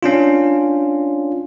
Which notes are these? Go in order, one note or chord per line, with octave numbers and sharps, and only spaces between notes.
C#4 D4 F4